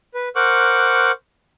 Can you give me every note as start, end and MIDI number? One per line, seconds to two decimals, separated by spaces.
0.14 0.29 71
0.36 1.12 70
0.36 1.12 72
0.36 1.12 78
0.36 1.12 85
0.36 1.12 86
0.36 1.12 90